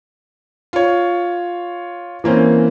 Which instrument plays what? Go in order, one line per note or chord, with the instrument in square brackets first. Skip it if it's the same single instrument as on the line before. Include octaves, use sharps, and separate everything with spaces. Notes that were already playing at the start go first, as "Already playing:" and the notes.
[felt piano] F4 C#5
E3 A#3 C4 C#4